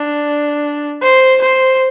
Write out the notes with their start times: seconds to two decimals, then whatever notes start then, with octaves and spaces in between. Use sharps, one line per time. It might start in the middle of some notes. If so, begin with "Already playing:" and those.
Already playing: D4
1.03 C5
1.42 C5